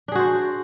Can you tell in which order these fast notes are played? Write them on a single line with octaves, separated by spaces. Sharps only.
D4 G#4 F#4 C5